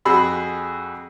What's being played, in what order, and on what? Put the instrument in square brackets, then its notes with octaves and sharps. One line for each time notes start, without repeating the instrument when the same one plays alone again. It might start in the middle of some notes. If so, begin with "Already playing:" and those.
[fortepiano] F2 F#4 G#4 B5 E6